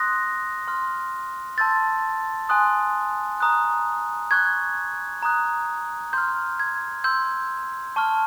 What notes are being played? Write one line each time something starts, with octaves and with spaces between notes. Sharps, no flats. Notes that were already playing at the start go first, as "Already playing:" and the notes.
Already playing: C6 D#6 F#6 A#6
C6 F6
A5 C6 E6 G6 A6
G#5 C6 D#6 F#6
A#5 D#6 F#6
C#6 F#6 G#6
A#5 D#6 F#6
C6 F6 G6
G#6
C6 E6 G6
A5 C#6 F6